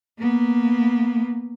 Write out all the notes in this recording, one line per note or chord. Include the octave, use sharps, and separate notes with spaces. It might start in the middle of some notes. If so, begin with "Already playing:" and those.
A#3 B3